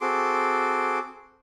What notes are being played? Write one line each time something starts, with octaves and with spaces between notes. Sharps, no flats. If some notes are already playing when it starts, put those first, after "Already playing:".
C4 F#4 G#4 A4 C6 D6